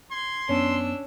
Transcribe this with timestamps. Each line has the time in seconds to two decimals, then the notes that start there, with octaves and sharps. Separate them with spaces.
0.11 C6 G#6
0.49 F#2 B3 C#4 D4 E6